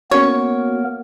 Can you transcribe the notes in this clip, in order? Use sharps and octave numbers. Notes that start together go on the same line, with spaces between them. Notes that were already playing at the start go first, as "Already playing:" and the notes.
A#3 B3 C#4 F#4 A#4 C#5